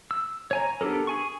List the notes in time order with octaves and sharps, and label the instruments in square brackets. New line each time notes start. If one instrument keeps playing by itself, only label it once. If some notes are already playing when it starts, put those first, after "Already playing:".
[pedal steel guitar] E6
C#5 G#5 A#5
B3 D4 G4 A4 A#4
G#4 G#5 C#6